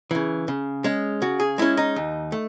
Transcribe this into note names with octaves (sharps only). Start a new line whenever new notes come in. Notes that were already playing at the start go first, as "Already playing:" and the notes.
C#3 E3
C#3
G#3 C#4
C#3 F#4
G#4
G#3 C#4 E4
D#4
D#2
A3